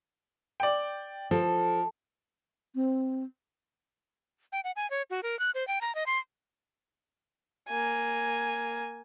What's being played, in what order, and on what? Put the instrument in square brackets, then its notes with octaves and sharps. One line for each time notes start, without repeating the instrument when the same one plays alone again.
[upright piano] D5 G5
[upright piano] F3 [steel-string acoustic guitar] A4
[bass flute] C4
[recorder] G5
F#5
G#5
C#5
F#4
A#4
F#6
C5
G5
A#5
D#5
C6
[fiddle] A#3 G#5